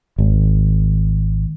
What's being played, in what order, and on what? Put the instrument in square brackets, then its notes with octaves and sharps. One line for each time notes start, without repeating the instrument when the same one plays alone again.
[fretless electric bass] G#1